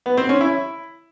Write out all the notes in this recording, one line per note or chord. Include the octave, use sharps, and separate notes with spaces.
B3
C4
C#4
E4